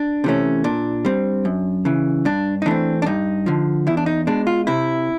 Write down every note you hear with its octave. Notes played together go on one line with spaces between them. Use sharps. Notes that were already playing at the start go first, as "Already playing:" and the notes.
Already playing: D4
C3 E3 A3 C#4
A#2 D4
G3 C4
F#2
C#3 E3
G2 D4
D#4
E3 A3 C4 D4
D4
G2 D#4
D3 F3
E2 E4
D4
D#4
B2 G#3 D4
F4
C3 E4